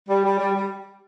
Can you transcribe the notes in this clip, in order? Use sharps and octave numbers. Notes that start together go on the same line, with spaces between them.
G3
G3
G3
G3